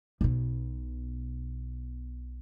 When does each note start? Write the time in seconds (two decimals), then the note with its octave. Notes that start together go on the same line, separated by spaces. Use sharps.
0.21 B1 B2